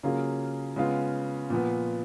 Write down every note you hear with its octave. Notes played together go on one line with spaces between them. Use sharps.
C#3 F#3 A#3 F4 G#4
C#3 G#3 B3 F4
A#2 F3 B3